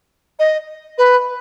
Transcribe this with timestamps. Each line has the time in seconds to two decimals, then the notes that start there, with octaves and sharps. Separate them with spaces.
0.39 D#5
0.98 B4